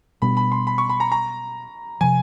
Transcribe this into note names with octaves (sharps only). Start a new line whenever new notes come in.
B2 G3 B3 D4 B5
B5
C6
B5
C#6
B5
A#5
A#5
C3 F3 G#5